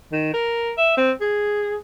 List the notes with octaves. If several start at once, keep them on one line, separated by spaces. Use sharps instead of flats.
D#3
A#4
E5
C4
G#4